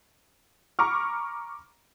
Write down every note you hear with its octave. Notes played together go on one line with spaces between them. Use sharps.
A#5 B5 C#6 D6 F6